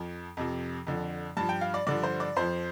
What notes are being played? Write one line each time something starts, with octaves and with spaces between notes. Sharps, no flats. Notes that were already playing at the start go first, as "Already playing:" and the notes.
Already playing: F2 F3
F2 C3 F3
F2 D3 F3
G2 F3 A5
G5
F5
D5
G2 D3 F3 D5
C5
D5
F2 F3 C5